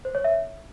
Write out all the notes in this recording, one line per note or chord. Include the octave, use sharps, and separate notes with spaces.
C5
C#5
E5